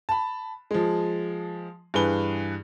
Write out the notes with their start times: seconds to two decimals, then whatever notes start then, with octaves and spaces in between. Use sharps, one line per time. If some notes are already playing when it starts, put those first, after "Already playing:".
0.09 A5 B5
0.71 F3 G#3
1.94 G2 E3 G#4 B4 G7